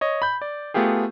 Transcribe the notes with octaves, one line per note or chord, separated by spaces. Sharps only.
C#5 D#5
B5 G6
D5
A3 B3 F4 G4 G#4